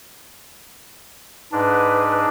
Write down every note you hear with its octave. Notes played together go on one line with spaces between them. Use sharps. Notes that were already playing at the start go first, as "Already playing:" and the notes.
G#2 D4 B4